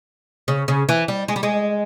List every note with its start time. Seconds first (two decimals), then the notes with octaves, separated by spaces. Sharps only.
0.48 C#3
0.68 C#3
0.89 E3
1.08 G3
1.28 G#3
1.36 G3
1.43 G#3